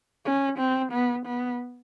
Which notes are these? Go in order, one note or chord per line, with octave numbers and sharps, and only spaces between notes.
C#4
C4
B3
B3